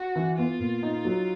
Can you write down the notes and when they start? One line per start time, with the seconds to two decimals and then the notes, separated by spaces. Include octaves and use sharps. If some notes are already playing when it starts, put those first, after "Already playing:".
Already playing: F#4
0.16 E3
0.37 B3 F4
0.60 A#2
0.83 D#4
1.05 F#3